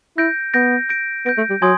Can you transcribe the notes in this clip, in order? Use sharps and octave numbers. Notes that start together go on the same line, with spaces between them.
E4 G6 A#6 D7
B3 G6 A#6 D7
G6 A#6 D7
B3 G6 A#6 D7
A3
G3
F#3 G#5 C6 D#6 G#6